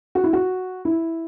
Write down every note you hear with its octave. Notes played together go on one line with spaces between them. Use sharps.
F#4
E4
F#4
E4